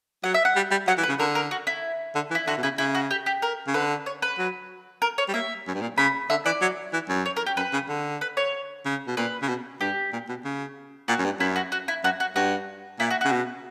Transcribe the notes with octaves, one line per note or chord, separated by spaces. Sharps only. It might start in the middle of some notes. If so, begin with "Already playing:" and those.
F#3 F#5
E5
F#5
G3
G3
F#3 F#5
E3
B4
C#3
D3 A#4
A#4
F#4
E4
D3
E3
E4
D3 F#4
B2
C#3 E4
C#3 E4
F#4
G4
G4
A#4
C#3
D3 B4
C#5
B4
F#3
A#4
C#5
G3
A#3 E5
F#2
G2
A#2
C#3 B5
D3 E5
E3 D5
F#3
E3
F#2
C#5
A#4
G4
F#2 B4
C#3
D3
B4
C#5
C#3
B2
A#2 B4
C#3
B2
G2 G4
A#2
B2
C#3
A#2 F#4
F#2
G2
F#2 E4
F#4
F#4
E4
F#2 F#4
F#4
G2 F#4
A#2 E4
F#4
C#3 F#4
B2